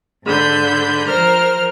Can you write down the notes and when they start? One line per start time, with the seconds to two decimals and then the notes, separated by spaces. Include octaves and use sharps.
0.24 G#2 D3 B5 G6
1.07 F3 A#4 C5 F6